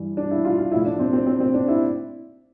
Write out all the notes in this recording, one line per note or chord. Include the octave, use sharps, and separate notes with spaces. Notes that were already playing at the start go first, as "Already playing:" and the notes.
Already playing: G2 E3
D4
E4
F4
F4
A2 F3 E4
D4
C4
C4
C4
C4
D4
E4